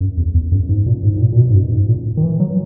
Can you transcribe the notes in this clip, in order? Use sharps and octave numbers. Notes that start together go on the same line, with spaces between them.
F#2
E2
E2
F#2
G#2
A#2
G#2
G#2
A#2
A#2
B2
G#2
F#2
G#2
A#2
D#3
E3
F#3